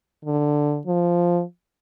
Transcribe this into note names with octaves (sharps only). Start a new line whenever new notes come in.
D3
F3